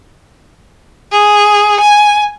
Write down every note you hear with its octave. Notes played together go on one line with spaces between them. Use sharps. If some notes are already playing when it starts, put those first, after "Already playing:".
G#4
G#5